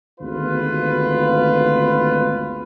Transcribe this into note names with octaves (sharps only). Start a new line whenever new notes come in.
G#1 D2 B3 F4 B4